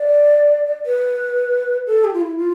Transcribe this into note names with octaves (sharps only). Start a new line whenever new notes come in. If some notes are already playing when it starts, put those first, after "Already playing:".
Already playing: D5
B4
A4
G4
F4
E4
F4